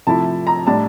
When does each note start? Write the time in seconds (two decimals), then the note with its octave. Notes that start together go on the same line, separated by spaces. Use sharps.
0.07 C3 F3 A3 E4 A5
0.47 A#5
0.67 A2 G3 D4 A5